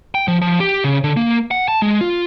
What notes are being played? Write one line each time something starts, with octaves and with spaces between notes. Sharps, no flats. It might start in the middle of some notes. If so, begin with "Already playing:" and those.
G5
F3
F3
G4
C#3
D3
A#3
F#5
A5
G#3
F4